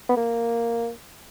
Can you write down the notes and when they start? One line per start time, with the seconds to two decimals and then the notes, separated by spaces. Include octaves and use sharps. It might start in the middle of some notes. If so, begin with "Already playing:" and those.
0.09 B3
0.17 A#3